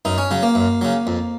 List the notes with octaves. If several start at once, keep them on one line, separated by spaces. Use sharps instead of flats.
F#2 D#4
C#4
C#3 F#3
A#3
F#2
C#3 F#3
F2